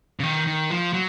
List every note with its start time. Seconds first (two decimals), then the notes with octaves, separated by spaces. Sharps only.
0.20 C#3
0.23 D#3
0.47 D#3
0.70 F3
0.93 F#3